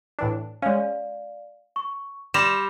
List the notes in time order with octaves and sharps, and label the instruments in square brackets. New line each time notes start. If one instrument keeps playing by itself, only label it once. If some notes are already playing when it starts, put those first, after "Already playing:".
[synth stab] A2 E3 D4
[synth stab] G#3 C#4 [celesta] D5 F5
[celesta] C#6
[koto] G3 [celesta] C6 A#6 F7 [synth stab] E7